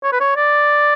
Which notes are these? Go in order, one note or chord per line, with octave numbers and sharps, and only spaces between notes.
C#5
B4
C#5
D5